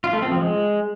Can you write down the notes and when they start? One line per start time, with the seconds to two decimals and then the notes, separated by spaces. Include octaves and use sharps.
0.04 F4
0.13 A3
0.22 C4
0.32 F3
0.41 G#3